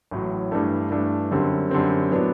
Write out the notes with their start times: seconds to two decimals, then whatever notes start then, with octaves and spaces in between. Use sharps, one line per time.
0.11 A1 A2 F#3
0.51 G2 E3 A3 D4
0.90 G2 E3 A3 D4
1.31 F#2 D3 G3 C4
1.71 F#2 D3 G3 C4
2.11 A2 F#3 B3 D4